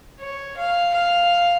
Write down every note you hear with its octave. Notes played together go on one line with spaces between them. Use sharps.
C#5
F5
F5